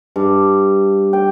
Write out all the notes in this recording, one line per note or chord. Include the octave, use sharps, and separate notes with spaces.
G2
G5